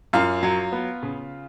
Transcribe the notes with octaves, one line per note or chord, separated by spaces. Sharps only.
F#2 F4 F5
F#3
B3
C#3